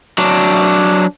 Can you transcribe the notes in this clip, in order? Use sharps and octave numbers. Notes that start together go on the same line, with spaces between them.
F#3 D4